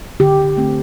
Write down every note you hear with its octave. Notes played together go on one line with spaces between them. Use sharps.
D3 G4
A3 C4